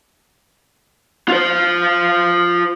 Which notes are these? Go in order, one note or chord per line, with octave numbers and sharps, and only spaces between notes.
F4 C5